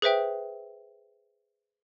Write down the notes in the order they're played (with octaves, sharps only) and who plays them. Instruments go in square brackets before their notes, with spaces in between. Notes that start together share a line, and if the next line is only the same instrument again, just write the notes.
[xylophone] G#4 B4 C5 E5 G5